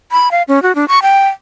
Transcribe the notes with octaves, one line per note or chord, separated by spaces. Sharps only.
B5
F5
C#4
F#4
D4
C#6
G5